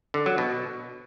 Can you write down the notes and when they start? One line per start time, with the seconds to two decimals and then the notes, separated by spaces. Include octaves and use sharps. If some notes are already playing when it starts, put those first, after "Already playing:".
0.14 D3
0.26 F#3
0.38 B2